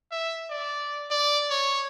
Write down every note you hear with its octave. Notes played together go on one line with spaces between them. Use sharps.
E5
D5
D5
C#5